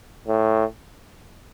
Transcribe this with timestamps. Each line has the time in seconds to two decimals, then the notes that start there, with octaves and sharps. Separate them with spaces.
0.27 A2